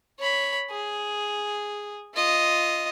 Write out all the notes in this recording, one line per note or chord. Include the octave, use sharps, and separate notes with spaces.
C#5 B5
G#4
F4 D#5